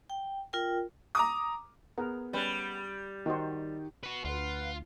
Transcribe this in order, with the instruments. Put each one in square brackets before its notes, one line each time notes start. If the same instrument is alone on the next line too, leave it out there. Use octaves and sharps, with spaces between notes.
[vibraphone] G5
F4 A#4 G5
[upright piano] A#5 D6 D#6
[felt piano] B3 G#4 [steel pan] A#4
[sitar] G3 [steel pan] C#4 B4
[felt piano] D#3 [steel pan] D#4 F#4 C5
[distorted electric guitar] F#4 B4
[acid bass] D2 [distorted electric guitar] F4 [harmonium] B4 F5 F#5